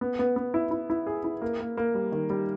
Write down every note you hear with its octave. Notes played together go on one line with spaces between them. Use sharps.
B3
B3
B3
E4
E4
E4
G#4
E4
A#3
A#3
A#3
G3
D#3
G3